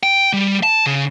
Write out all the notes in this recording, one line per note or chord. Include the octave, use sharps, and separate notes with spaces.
G5
G3
A5
C#3